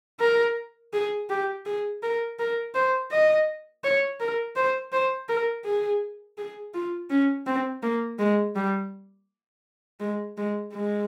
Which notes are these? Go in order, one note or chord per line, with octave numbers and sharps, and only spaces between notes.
A#4
G#4
G4
G#4
A#4
A#4
C5
D#5
C#5
A#4
C5
C5
A#4
G#4
G#4
F4
C#4
C4
A#3
G#3
G3
G#3
G#3
G#3